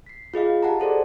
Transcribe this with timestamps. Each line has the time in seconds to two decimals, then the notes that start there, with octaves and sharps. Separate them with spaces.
0.06 B6 C7
0.34 F4 G#4 D#5 F5
0.63 G4 D#5 F#5 A5 A#5
0.80 G#4 A4 C5 D5